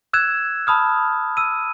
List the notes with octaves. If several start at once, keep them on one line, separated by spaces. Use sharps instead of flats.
E6 F#6 G#6 E7
A5 B5 D#6 F6
E6 D#7